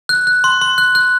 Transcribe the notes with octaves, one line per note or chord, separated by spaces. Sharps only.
F#6
F#6
C6
C6
F#6
F#6